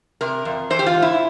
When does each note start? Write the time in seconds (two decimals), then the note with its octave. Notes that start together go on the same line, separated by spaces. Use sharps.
0.21 C3 A#4
0.45 F2
0.70 E3 C5
0.79 G4
0.86 F4
0.94 G#2
1.02 E4